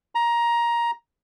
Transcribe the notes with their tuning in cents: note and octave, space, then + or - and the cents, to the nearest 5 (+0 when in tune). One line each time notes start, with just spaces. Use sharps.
A#5 +15